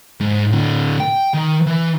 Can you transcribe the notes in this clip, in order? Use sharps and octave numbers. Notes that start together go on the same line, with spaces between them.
G#2
A2 D3
G5
D#3
E3